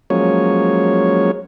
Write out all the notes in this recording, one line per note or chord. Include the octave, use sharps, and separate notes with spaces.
F3 F#3 G#3 A#3 C#4 C#5